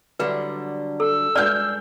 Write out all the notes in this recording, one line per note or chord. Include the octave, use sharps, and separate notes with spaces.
D3 F#3 G3 B4
A4 E6
G2 G#3 D5 F6 G6